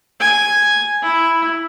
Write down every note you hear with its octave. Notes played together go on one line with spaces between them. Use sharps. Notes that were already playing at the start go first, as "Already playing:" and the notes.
G#5
E4